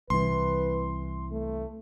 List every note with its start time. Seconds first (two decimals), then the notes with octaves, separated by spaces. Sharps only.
0.10 C2 E3 B4 C6
1.32 A3